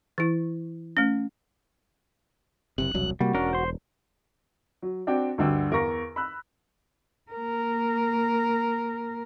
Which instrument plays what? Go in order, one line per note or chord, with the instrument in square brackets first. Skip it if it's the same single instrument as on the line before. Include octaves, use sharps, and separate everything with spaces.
[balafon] E3 E4
A3 C#4
[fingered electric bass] F#1 C3 [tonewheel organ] F#6
[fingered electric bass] E1 C2 F#3
[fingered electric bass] C3 A#3 [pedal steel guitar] G3 [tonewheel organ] F#4
[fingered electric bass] E1 [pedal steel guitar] C#4 D4 A#4
[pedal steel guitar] C5 C6
[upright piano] F#3
C4 D4 F#4 G5
D2 G2 D3 G5 E6
E2 A#4 F5 A#5 C#6 A#6
B5 E6 F#6
[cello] A#3 A#4